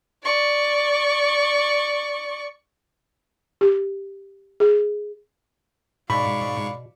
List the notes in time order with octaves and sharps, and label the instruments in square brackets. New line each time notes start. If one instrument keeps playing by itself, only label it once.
[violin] D5 C#6
[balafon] G4
G#4
[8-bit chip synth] G#2 C#6 [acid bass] B2 [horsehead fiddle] D5 F5 [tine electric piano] B5